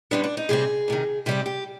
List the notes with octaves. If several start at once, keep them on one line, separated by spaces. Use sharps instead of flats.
G2 D3 G3 B3 D4
D4
D#4
C3 G3 C4 G#4
D2 C3 D#3
C3 G3 C4 G4
G4